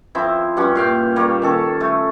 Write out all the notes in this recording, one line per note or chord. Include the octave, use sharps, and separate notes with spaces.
F3 C4 E4
G2 G3 C#4 F#4
A#2 F5 G5
G3 A#3 C#5
D#3 C#4 A4
A3